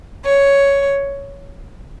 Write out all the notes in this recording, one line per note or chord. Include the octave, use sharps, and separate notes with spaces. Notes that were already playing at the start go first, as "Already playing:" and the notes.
C#5